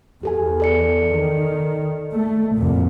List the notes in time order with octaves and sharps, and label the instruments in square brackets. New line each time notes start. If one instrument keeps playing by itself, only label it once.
[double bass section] E2 [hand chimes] G4 A4 G#5
[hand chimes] A4 D5 C#7
[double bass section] D#3
A3
C2 F2 A#2